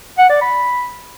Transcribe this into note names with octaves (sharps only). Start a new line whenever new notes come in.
F#5
D5
B5